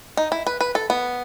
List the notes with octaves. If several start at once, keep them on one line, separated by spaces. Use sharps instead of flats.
D#4
E4
B4
B4
A4
B3